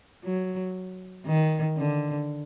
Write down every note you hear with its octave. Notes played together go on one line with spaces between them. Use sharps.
F#3
D#3
D3